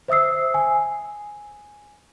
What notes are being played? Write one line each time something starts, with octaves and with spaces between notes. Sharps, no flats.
C5 E5 D#6 E6 C7
G#5